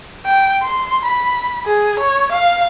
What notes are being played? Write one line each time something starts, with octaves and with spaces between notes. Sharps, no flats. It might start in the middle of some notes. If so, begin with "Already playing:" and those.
G5
C6
B5
G#4
C#5
F5